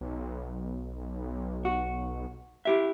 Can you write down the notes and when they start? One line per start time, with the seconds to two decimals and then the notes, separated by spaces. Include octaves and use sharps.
0.01 B1
1.65 F#4
2.65 E4 G4 E5